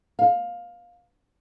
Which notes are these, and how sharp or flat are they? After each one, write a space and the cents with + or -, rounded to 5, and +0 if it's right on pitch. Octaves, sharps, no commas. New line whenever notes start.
F5 +15